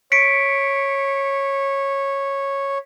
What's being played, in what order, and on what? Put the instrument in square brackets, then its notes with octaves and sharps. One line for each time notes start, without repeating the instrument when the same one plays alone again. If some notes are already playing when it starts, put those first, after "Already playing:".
[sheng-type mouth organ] C#5 [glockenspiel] B6 C#7 D7